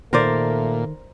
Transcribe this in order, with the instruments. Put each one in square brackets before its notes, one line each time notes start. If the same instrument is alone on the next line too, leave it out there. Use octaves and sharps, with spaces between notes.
[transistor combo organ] A#2 [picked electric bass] D#3 [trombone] A3 [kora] A#4 C5 D5